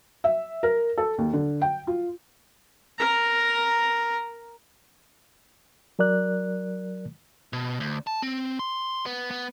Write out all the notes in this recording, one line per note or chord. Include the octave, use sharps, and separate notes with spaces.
E5
A#4
A4
D#2
D3
G5
F4
A#4 A#5
F#3 A#4 D5 F#6
B2
D2
A5
C4
C6
B3
B3